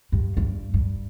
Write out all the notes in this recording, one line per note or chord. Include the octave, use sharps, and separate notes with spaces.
G2
G2
G2